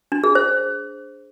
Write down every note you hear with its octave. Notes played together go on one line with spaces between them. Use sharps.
D4
G#4
C5